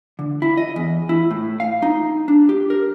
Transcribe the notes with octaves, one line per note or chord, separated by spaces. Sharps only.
D3
E4
D#5
E2
E4
A2
F5
D#4
D4
G4
A#4